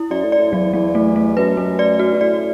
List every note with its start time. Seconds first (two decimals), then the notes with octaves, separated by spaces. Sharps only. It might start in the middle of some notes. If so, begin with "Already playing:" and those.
Already playing: E4
0.10 F#2 D5
0.24 A2
0.32 D5
0.38 A2
0.52 E2 F#3
0.74 E2 F#3
0.95 A3
1.16 A3
1.37 F#2 B4
1.57 A3
1.79 D5
1.99 F#4
2.13 B2
2.20 A2 D5